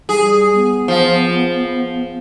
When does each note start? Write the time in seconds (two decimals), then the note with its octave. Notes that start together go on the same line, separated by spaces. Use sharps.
0.09 G3 G#4
0.55 B3
0.88 F3